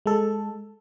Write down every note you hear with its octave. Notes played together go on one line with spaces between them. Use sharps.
G#3 A4